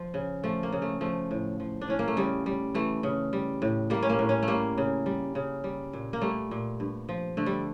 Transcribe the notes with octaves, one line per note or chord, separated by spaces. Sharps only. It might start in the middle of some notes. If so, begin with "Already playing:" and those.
Already playing: F3
C#3
F3 A3
A#3
C#3
A3
F3 A3
A2
F3
D4
A2 C#4
A#3
A3
C#3 G3
G3
E3 A3
C#3
G3
A2
G3 A#3
C#4
A#3
A2
C#4
A3
G3 A#3
C#3
G3
C#3
G3
A#2
A#3
G3 A3
A#2
G2
F3
D3 A3
G3